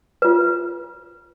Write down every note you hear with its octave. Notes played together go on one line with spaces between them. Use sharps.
F4 B4